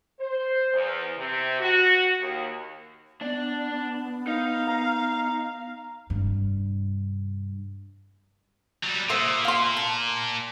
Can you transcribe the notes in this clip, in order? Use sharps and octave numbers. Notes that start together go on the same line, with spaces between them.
C5
E2
C3
F#4
D#2
B3 D4 D5
D#4 F5
A#5
G2 C3
F#3 G3
A#2 C5 E5 D#6
F5 C6
A5